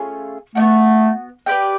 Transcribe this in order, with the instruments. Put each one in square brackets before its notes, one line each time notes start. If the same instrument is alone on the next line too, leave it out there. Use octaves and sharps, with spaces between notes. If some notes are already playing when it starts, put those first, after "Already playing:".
Already playing: [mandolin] A3 C#4 F4 G#4
[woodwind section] A3 [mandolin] D4 F#4
[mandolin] B3
G4 B4 D5 G5